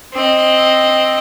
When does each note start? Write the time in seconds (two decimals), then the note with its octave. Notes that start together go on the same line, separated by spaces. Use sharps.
0.13 C4 D#5